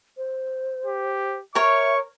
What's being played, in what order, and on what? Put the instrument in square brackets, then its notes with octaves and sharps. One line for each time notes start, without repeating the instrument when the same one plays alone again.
[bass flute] C5
[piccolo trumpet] G4
[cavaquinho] A#4 C#5 [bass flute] E5 [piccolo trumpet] C#6